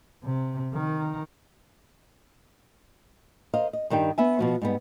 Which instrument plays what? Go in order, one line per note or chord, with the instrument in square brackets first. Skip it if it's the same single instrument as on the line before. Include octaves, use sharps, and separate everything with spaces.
[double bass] C3
D#3
[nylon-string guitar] A#4 C5 D#5 F5
D#5
G2 D#3 G3 G5
B3 E5 G#5
B2 F3 F#4
G#2 G3 B3